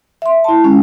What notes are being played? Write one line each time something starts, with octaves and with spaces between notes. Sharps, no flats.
E5 C6
E4 A5
G#3 C#4